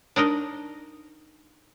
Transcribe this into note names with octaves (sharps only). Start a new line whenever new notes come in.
D4 D#4 A#4 D#5